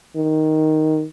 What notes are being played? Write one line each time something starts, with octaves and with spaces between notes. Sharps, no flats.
D#3